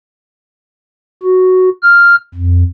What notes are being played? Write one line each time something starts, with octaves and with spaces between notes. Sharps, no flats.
F#4
F6
F2